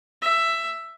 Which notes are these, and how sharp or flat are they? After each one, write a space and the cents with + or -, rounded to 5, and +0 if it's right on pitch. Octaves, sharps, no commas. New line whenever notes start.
E5 +10